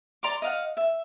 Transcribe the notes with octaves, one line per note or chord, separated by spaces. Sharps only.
D5 A#5 C6 D6
D#5 F5 F#5
E5